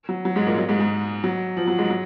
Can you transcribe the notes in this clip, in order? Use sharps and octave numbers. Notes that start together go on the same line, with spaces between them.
F#3
F#3
G#2 G#3
A#2 A#3
F#3
G#2 G#3
G#2 G#3
F#3
F3
F#3
G#2 G#3
F#3